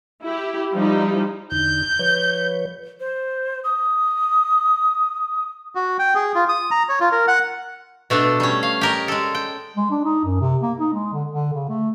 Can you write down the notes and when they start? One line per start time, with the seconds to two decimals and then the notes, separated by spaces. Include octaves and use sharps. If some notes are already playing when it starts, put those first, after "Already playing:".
0.23 E4 G4
0.74 F3 G3 D#4 E4
1.52 E2 D3 D#4 G6
1.99 F3 B4 C#5
3.00 C5
3.64 D#6
5.75 F#4
5.99 G5
6.15 G#4
6.35 F4
6.49 D#6
6.71 A#5
6.89 C#5
7.00 F4
7.12 A#4
7.28 F#5
8.10 B2 A3 D4 A4
8.40 G3 C#4
8.63 F5
8.81 G4 A#4 D#5
9.08 G#3 A4
9.35 G5
9.77 G#3
9.91 D4
10.05 D#4
10.25 F#2
10.41 C3
10.62 A#3
10.79 D#4
10.93 G#3
11.13 D3
11.31 D3
11.53 C#3
11.69 A3